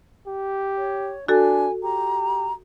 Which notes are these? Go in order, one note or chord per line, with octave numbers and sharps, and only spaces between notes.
G4
C#5
D4 F#4 A4 G#5
G4 A#5